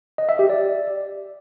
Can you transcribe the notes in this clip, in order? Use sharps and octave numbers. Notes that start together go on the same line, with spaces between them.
D#5
E5
G4
D5